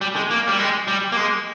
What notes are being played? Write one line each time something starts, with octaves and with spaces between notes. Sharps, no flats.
G3
G#3
A#3
G3
G#3
G3
A#3
G#3